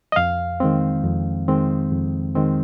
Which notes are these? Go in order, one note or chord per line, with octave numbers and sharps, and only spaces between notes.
D#5
F2 F5
D#3 G#3 C4
F2
D#3 G#3 C4
F2
D#3 G#3 C4